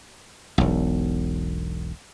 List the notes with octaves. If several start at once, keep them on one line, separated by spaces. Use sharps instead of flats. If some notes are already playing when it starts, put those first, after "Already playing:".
E1 B1